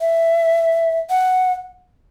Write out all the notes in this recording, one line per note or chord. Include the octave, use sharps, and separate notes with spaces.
E5
F#5